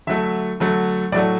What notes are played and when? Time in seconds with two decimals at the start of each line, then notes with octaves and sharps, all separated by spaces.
0.07 D3 F#3 A3 E5
0.60 D3 F#3 A3
1.12 A2 F#3 A3 D5